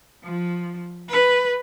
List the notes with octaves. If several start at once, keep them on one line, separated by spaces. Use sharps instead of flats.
F3
B4